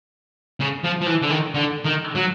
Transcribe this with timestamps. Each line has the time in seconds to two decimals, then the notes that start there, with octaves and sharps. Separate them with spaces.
0.60 C#3
0.84 F3
1.01 F3
1.06 E3
1.22 D3
1.30 D#3
1.54 D3
1.85 D#3
2.16 F#3